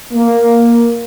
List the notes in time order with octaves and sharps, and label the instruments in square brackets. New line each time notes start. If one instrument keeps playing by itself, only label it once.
[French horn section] A#3